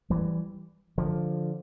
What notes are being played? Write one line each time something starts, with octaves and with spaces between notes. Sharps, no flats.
E3 G3
D3 F3